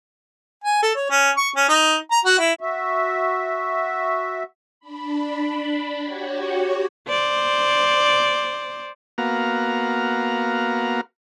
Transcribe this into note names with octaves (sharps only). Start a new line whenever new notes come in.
G#5
A4
C#5
C#4
C#6
C#4
D#4
A#5
F#4
E4
F#4 E5
D4 B5
F#4 G4 C#5
C5 D5
A#3 B3 F#4 F5 A#5